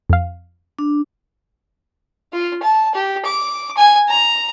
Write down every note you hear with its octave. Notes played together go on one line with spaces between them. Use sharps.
F2 F5
D4
F4
A5
G4
D6
G#5
A#5